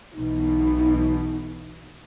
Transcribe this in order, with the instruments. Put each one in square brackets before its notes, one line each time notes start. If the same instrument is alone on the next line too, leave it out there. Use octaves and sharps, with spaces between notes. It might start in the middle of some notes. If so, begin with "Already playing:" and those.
[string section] B1 B2 E3 [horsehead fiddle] D#4